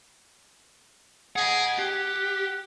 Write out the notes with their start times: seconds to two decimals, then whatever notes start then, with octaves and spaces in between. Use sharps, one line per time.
1.36 G#4 D#5 F#5
1.78 G4 F#5